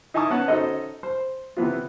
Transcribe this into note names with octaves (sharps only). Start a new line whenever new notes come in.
D#4 E4 G#5 A5 C#6 D#6
B3 C#4 C#5 F#5 A5
C#4 D#4 F#4 A4 C5 D#5
C5
C3 E3 B3 F4